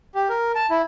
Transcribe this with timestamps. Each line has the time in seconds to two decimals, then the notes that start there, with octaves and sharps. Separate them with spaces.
0.15 G4
0.29 A#4
0.55 A5
0.70 E4